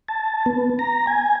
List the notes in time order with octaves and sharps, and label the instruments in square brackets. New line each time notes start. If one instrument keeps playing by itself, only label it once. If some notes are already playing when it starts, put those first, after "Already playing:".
[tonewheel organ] A5
B3
A#5
G#5